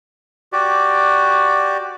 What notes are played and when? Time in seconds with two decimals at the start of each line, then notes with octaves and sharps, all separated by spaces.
0.53 F#4 G4 D5